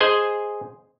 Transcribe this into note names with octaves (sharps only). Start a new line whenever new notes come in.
G#4 C5 D#5 G#5